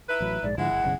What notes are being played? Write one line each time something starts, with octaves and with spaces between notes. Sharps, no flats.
D#4 E4 B4
A1 F#3
A#1 G#2 G#3 D5
G#2 D3 F3 G#3 E4 F#5
F#1
F#1 B1 C#3